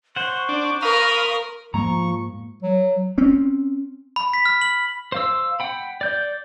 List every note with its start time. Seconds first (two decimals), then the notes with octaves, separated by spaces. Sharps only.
0.16 C5 F#5 C#6
0.49 D4
0.82 A#4 F5 B5 D#6
1.74 G#2 F3 G#3 A#3 A#5 C#6
2.63 F#3
3.18 C4 C#4
4.16 B5
4.34 B6
4.45 F6
4.61 F#7
5.12 C5 F5 E6
5.60 F#5 G5 B5
6.01 D5 G6